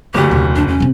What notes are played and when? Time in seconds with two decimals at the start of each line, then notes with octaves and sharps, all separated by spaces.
0.14 F#1 D2 D#3 G4
0.31 D#2 C3
0.55 C#3 D4
0.68 E2 C#4
0.80 C3 C4